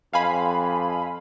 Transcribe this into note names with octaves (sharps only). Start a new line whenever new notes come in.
F2 F5 G#5 B5